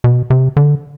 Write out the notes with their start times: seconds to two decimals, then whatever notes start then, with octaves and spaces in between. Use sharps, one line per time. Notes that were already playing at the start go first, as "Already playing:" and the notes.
0.04 B2
0.30 C3
0.57 D3